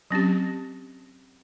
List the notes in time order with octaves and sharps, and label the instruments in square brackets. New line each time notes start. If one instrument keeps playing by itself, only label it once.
[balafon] F#3 C4 C#4 G4